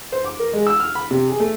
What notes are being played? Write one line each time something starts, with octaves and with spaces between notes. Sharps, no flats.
C5
D6
A#4
G#3
E6
F6
B5
C3
G#4
A3